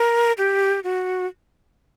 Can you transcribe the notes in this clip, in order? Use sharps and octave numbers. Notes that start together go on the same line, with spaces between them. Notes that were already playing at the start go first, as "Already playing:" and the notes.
Already playing: A#4
G4
F#4